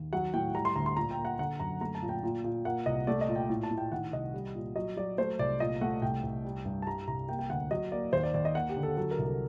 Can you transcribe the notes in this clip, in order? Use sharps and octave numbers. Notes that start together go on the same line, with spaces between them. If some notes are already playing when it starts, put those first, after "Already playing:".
Already playing: D#2
F#3 F#5
A2 G5
G3 A#5
C6
D2 A#5
C6
A#2 A#5
G5
A#3
F#5
D3 F#5
F#2 A#5
A3 A#5
A5
A#2
G5
A#2
A#2
A#3 F#5
C2 D#5
A3 D5
D#5
A#2
G5
A2
A5
A2
G5
D#3 F#5
C2 D#5
G3
A#2
F#3 D#5
F#3 D5
A3 C5
C2 D5
A#2 D#5
A3 F#5
C2 G5
C2
G3
G2
A5
G3 A#5
C2 A#5
A#3 G5
G5
D2 F#5
F#3 D#5
A#3 D5
D#2 C5
D5
D#2 D5
D#5
A#3 F#5
G4
D3
A4
F#3 A4
A#4
C2
A4